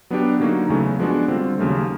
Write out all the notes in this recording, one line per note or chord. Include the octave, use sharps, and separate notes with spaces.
F#3 B3 D4 G4
D3 F#3 A#3 D#4 F#4
E2 C#3 F#3 A3
F3 G#3 B3 D4 F#4
D3 G3 C4 F4
D#2 C#3 F#3 A3